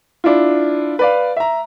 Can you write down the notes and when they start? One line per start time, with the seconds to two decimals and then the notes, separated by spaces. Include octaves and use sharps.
0.24 D4 E4 F4
0.99 B4 D5 F5
1.37 E5 A#5